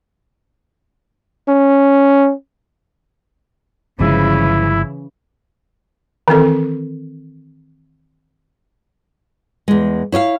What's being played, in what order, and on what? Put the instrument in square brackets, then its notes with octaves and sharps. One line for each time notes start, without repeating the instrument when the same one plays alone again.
[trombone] C#4
[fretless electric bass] G1 F3 G#3 [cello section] C#3 E3 [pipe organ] E4
[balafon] D#3 E3 C4 A4
[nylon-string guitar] E2 G#3
E4 C#5 D#5 F5